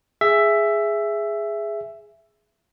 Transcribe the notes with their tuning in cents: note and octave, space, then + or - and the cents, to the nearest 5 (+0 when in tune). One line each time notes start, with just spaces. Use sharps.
G#4 +0 E5 +10